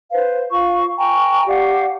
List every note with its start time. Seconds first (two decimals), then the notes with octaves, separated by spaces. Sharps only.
0.11 B4 C5 F5
0.51 F4 F5 C#6
0.98 G5 G#5 A#5 C#6
1.47 G4 D5 F5 F#5